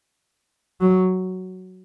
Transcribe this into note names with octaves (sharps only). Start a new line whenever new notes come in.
F#3